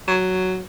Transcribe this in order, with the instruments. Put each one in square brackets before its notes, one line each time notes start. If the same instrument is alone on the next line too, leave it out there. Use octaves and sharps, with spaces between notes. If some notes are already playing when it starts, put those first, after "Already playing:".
[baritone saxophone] F#3